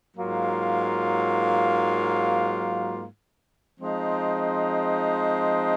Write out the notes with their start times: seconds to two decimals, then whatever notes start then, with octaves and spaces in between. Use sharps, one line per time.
0.16 G#2 F#3 A#3 F4
3.79 F3 G#3 C4 D#4